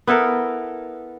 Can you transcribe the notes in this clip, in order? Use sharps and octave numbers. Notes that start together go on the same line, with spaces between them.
B3 E4 A4 A#4